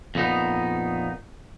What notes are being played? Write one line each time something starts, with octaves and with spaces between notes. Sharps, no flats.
F2 A#2 B3 D#4